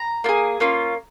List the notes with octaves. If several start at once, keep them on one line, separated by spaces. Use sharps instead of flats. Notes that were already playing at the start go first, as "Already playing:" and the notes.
Already playing: A#5
A#3 F4 G#4
A#3 C#4 F4